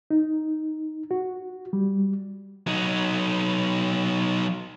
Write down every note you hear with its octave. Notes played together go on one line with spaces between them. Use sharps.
D#4
F#4
G3
F#3 D#4